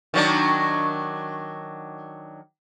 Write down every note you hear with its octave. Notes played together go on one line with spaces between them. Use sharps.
D#3 F#3 D4